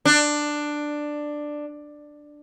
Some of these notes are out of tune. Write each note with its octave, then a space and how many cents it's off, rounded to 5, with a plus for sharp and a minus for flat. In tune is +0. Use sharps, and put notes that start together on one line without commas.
D4 +10